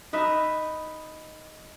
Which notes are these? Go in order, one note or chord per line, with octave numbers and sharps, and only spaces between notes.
D#4 B4 D#5 E5